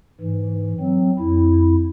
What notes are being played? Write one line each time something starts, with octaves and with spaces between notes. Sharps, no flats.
G#2 E3
F#3 C4
F2 E4